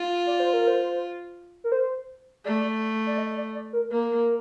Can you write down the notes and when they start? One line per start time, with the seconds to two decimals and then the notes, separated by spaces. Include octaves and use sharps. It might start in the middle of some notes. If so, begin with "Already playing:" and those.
Already playing: F4
0.27 D5
0.40 C5
0.53 A#4
0.67 C5
1.64 A#4
1.72 C5
2.45 A3 D5
3.07 D5
3.18 D#5
3.37 D5
3.54 D5
3.73 A#4
3.91 A#3 A#4